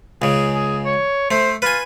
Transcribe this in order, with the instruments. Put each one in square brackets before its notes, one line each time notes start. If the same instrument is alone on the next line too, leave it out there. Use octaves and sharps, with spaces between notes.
[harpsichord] C#2 C#3 [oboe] G#4
[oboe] G#4
C#5
[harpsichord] A3 [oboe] C5
[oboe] F4 [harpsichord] B4 G#5